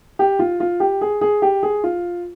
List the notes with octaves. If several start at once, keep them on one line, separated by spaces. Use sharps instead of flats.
G4
F4
F4
G4
G#4
G#4
G4
G#4
F4